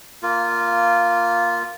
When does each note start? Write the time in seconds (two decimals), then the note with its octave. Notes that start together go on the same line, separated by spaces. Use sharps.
0.22 A#3 F4